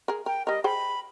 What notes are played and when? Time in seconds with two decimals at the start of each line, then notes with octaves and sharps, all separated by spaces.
0.08 G#4 A#4
0.26 A#4 G5
0.47 G3 A#4 D#5
0.64 G#4 C5 G5 B5